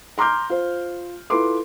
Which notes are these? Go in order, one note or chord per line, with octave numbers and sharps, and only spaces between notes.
A#5 C6 D6 F6 G6
F4 C5
E4 F4 A4 B4 C6 D6